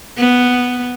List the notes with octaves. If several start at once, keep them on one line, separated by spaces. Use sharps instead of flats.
B3